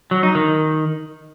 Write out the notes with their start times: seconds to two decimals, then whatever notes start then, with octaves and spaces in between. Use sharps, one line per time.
0.11 F#3
0.23 D#4
0.35 D#3